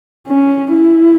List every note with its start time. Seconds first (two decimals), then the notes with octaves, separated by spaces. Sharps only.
0.27 C#4
0.72 E4